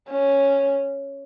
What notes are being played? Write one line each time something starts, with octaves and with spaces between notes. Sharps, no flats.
C#4